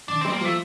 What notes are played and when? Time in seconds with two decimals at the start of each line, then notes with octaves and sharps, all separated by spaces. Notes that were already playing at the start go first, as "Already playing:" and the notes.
0.08 D#3 D4
0.21 G3 C4
0.33 A#3
0.41 F3 A3